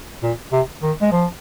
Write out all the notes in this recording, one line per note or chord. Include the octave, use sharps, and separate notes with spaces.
A#2
C3
D#3
G#3
F3